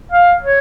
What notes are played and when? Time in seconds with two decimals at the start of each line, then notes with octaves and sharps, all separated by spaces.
0.12 F5
0.43 C#5